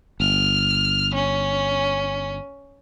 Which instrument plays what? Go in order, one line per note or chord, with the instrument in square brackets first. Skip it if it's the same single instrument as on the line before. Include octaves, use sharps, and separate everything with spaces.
[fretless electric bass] G1 [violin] F6
[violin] C#4